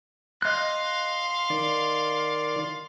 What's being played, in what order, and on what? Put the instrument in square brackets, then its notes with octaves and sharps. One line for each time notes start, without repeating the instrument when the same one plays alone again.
[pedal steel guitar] D#5 F#6 [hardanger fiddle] F5 C6
[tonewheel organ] D#3 D5